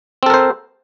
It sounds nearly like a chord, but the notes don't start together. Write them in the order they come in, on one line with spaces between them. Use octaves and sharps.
C4 A4 A#4 C5